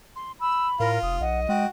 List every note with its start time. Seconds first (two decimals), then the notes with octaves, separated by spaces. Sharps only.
0.16 C6
0.41 B5 E6
0.80 A2 F4 A#4
1.03 F1 D#6
1.21 B1 D#5 F#5
1.49 G#3 F#4 G5